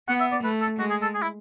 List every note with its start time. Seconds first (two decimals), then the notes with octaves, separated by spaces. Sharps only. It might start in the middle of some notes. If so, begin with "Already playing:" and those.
0.08 B3 F#5
0.20 E5
0.32 D5
0.43 A3 B4
0.61 A4
0.79 G#3 F#4
0.90 G#4
1.02 A4
1.14 G#4
1.22 E4